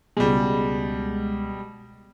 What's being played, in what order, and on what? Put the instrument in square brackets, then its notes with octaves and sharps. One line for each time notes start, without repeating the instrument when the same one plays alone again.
[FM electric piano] C#2 G#3 [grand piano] B2 G3